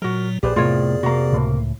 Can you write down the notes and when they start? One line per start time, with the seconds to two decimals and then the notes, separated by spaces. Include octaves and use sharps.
0.02 A#2 F#3 F#4 A#4
0.43 A#1 G4 G#4 B4 C5 D5
0.56 F2 A2 C3 B3 F4 A#4 C#5
1.03 C3 A#3 F#4 A#5
1.32 C#2 A2